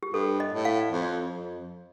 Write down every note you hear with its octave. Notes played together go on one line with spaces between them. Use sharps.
G4
G2 A4
D#5
A2
F5
F2
F2